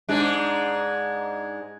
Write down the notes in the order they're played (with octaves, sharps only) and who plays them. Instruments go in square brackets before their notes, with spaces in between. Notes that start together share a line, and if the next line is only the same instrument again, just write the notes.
[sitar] G#2 G#3 D4